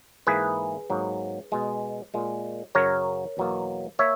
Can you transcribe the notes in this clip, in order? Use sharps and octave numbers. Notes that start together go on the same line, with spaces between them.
G#2 E3 A#3 G#4 B4
G#2 F#3 A#3
B2 G#3
A#2 G#3
F#2 C#3 F#3 A#4 C#5
E2 B2 F#3 A#3
A#3 C#5 E5